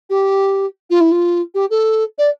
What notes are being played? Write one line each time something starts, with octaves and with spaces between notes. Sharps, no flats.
G4
F4
E4
F4
G4
A4
D5